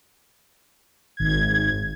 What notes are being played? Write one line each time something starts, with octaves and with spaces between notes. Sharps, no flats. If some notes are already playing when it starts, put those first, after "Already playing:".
G#1 G#6